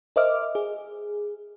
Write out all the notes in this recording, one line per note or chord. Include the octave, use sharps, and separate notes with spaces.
A#4 C5 D#5 E5 D6 F6
G#4